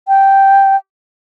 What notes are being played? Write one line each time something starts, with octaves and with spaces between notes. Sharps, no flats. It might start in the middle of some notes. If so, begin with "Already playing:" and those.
G5